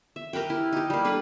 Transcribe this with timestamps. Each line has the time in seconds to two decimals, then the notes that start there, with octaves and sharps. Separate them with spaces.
0.16 E5
0.33 G4 A#4 B4 G5
0.50 E4
0.72 D#4 G4
0.90 G3 A#3
1.05 D4 A4 B4